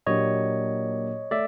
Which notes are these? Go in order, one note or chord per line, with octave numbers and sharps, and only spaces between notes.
A#2 F#3 A#3 D4 G4 C#5 D#5
A3 D5 E5